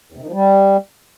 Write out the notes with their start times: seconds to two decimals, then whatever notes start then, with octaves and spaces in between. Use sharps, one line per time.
0.12 E2
0.17 C3
0.22 D#3
0.27 F3
0.32 G3